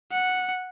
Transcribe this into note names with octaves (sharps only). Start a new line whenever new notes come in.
F#5